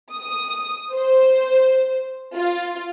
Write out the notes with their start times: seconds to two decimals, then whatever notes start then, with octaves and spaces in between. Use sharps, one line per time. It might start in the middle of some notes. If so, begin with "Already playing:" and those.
0.12 D#6
0.94 C5
2.37 F4